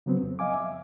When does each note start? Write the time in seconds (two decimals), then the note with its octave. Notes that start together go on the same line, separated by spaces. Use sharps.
0.06 C#3 F#3 B3 C4
0.22 F2
0.39 D#5 F5 G#5 D6
0.54 E5